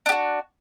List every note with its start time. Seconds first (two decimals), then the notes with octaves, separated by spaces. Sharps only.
0.06 D4
0.09 G4
0.12 F#4